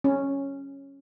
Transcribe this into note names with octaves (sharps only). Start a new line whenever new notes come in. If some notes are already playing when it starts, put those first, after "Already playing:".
C#4